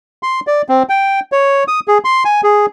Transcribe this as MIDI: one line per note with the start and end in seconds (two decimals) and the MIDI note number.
0.23 0.40 84
0.47 0.62 74
0.69 0.83 60
0.89 1.20 79
1.32 1.64 73
1.68 1.80 87
1.88 1.98 68
2.05 2.24 84
2.25 2.41 80
2.43 2.66 68